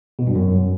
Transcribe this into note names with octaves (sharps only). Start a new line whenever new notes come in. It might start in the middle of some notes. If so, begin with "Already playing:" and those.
B2
G2
F#2